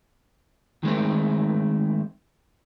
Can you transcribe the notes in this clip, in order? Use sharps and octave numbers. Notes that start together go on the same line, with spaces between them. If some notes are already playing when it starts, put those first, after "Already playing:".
D#3 G#3 A3 C4